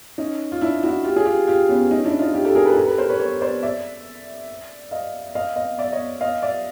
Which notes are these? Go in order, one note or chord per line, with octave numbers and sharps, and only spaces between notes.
C#4 D#4
F4
D4 E4
E4 F#4
F4 G4
G#4
F4 G4
F4 G4
B3 C#4
C#4 D#4
D4 E4
D#4 F4
F4 G4
G4 A4
G#4 A#4
A4 B4
G#4
G4 A4
A4 B4
A#4 C5
B4 C#5
B4 C#5
C5 D5
D5 E5
D#5 F5
D#5 F5
D#5 F5
D5 E5
C#5 D#5
D#5 F5
D5 E5